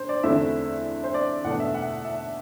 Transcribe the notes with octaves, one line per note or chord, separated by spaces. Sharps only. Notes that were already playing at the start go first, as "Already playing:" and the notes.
Already playing: D3 C5
D5
E2 D3 A3 C4 E4 E5
C5
D5
E2 B2 A3 D4 F#5
E5
F#5
E5